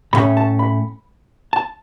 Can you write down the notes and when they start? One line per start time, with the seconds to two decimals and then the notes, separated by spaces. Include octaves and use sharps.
0.13 A2 F#3 A3 C#4 B5
0.37 A5
0.59 B5
1.53 A5